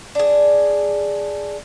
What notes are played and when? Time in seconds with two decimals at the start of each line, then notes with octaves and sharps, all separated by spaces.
0.15 D4 G#4